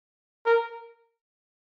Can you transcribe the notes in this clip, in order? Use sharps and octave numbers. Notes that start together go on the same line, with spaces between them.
A#4